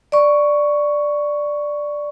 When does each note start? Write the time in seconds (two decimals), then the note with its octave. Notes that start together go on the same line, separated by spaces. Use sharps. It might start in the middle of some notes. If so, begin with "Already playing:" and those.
0.12 D5 C#6